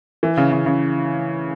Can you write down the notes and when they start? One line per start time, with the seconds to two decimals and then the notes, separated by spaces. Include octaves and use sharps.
0.23 E3
0.37 C#3
0.52 C#3
0.66 C#3